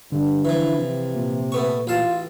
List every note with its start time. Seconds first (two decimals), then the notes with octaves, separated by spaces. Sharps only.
0.12 G2 D3
0.45 E3 F3 E4
0.76 C3
1.15 A#2
1.52 A3 B3 C#6
1.87 A1 F4 F5 A5